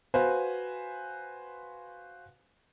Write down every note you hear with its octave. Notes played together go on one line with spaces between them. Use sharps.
F#4 B4 C5 F5 G#5